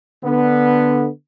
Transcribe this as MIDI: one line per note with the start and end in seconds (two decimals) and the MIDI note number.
0.23 1.08 50
0.23 1.08 59